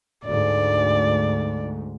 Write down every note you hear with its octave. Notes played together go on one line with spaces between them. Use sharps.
D2 G#2 D5